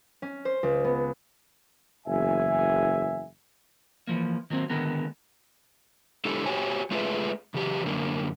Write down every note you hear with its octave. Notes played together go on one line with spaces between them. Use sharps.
C#4
C5
C#2
B3
F#1 E2 E5 G#5
E3 F3 A#3
D#3 F#3 A#3 C4
D3 D#3 G#3 B3 A#4
G#3 D4 E4 G4 A4
F#4 G4 C5 C#5 G5 G#5
G#3 A3 F4 G#4 B4 E5
C#3 E3 F#3 G4
F#2 D3 A#3